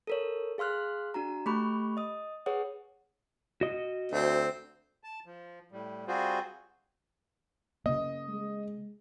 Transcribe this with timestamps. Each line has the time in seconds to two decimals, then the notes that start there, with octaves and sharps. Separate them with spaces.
0.07 A4 A#4 C#5
0.58 G#4 F5 C6 F6 F#6
1.14 D4 F#4 A#5
1.46 A3 G4 B5 C#6 F#6
1.97 D#5 D#6
2.46 G#4 B4 C#5 F#5 D#6
3.61 F#4 D#5
4.12 D2 C4
5.04 A5
5.26 F3
5.72 A2 G3
6.07 G3 C4 F4 F#4 G#4 C5
7.86 C#3 A#3 D#5
8.28 G#3